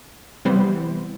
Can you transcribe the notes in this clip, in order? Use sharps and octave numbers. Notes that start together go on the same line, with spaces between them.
C3 E3 G3 B3 C5